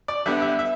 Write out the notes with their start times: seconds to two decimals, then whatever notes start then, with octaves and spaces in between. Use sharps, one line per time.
0.08 D5
0.26 D3 G3 B3 E5
0.42 E5
0.59 E5